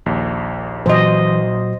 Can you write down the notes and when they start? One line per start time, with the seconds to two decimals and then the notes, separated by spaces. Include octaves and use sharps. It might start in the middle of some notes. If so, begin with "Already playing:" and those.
0.06 A#1 D#2
0.86 A#2 E3 F#3 F#4 C5 D#5